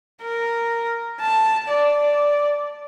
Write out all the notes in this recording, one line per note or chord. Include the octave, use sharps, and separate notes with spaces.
A#4
A5
D5